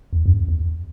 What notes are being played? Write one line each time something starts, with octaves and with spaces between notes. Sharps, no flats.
E2
F#2
E2